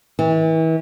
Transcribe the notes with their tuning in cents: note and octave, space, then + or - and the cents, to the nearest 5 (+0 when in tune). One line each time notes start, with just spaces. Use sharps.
E3 -35